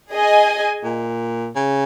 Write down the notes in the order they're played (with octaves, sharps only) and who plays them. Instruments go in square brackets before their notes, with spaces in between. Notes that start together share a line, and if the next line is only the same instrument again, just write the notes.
[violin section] G#4 D#5 G#5
[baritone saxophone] A#2
C#3